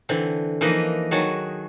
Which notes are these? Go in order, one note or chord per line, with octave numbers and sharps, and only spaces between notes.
D3 E3 C4
E3 F3 A#3 D#4 B4 D#5
D#3 F#3 F#4 G#4 A5